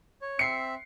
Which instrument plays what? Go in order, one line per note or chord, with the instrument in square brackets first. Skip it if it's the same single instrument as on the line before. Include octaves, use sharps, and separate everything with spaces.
[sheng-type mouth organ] C#5
[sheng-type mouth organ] C4 E5 [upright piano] C7 C#7